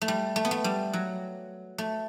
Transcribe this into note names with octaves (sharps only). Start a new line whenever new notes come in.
A3
G3
A3
B3
A3
G3
F#3
A3